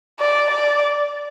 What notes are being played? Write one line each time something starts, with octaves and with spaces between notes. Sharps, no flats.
D5
D5